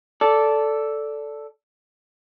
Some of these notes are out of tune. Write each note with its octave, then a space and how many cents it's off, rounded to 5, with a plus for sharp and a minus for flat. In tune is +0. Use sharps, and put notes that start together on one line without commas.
A4 +0 D5 -15